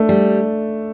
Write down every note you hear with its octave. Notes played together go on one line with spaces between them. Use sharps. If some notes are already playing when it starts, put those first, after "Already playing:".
Already playing: A3 D4
G3